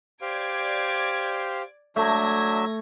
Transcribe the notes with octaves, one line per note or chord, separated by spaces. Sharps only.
G4 C5 D5 F5 G#6 D7
F#3 A3 D4 E5 G#6 A#6